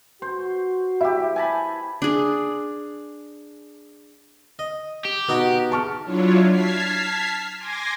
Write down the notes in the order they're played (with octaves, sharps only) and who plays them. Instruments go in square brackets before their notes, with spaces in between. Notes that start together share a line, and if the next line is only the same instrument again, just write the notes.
[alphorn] F#4 [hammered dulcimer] C5
[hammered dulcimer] E4 G4 [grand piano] E5
[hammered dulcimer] G#5 A5 B5
[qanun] D4 G#4
[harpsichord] D#5
[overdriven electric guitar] G4
[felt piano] B2 [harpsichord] B3 D#4 F#4
[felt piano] A5 C#6 F6
[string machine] F#3 D4 E4 F4 C#5
A5 F6 G#6 B6 C7
G#5 C6 D6 G#6 A#6